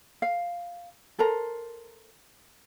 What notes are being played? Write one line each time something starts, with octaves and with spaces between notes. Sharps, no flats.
F5
A4 A#4 C5 A#5